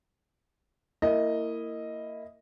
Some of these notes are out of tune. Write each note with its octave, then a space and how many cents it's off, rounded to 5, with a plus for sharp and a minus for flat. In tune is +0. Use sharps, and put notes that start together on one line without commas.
A#3 -25 E4 +0 D#5 +0